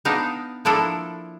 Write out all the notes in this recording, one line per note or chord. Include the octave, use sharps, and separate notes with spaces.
B3 D4 D#4 F5
F3 A#3 D4 E4 A4